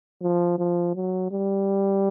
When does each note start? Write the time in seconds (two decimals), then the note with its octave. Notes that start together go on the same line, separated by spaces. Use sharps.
0.22 F3
0.58 F3
0.95 F#3
1.31 G3